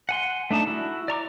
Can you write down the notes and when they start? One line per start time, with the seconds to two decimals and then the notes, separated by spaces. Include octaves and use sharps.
0.09 F#5 G#5 C6
0.51 A3 D4 D#4 A5
0.67 E4 F#4
1.08 D5 A#5 C#6 D6